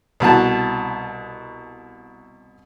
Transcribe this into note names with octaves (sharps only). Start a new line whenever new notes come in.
C2 B2 F#4 A5